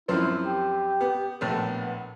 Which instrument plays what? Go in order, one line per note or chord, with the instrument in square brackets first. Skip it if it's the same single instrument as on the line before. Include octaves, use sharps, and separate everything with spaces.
[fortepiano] F#2 F3 C4 [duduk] E4
[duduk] G4
[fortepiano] B3
[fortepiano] A#1 A2 A3 [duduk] B3